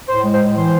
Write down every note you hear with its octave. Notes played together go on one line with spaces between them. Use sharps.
A2 C5
G#3
C5
A2
E3 C5